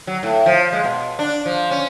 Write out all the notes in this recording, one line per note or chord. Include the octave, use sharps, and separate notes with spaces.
F#3
A2
F3
G#3
B2
D4
F3
C#4